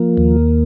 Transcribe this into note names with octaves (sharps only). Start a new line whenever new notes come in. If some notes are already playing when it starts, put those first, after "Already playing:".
Already playing: F3 A#3
D#2